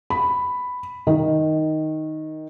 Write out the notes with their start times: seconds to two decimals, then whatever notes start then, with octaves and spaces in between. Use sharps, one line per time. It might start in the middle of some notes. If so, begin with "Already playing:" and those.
0.10 B5
1.07 D#3